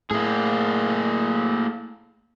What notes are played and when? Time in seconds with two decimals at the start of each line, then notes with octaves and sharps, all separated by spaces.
0.11 A2 A#3 G#4